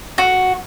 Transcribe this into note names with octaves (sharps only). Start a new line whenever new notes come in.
F#4